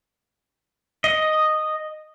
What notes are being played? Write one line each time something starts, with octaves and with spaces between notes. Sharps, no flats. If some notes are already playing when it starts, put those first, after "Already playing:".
D#5